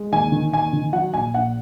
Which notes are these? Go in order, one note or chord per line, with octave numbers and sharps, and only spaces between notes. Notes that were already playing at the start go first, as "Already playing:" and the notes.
Already playing: G#3
D#2 G#5
D#3
D#2 G#5
D#3
F#3 F#5
A#1 G#5
A#1 F#5